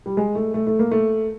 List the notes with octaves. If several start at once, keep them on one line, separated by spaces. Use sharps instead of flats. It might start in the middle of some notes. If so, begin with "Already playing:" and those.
G3
G#3
A3
A3
A3
A#3
A3